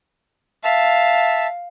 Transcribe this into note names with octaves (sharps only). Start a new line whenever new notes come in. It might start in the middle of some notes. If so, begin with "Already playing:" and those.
E5 F5 A5